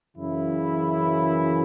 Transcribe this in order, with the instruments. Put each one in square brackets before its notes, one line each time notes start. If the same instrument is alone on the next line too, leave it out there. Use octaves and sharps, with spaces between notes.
[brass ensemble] F#2 C#3 E3 E4